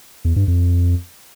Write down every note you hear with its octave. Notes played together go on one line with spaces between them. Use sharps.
E2
G2
F2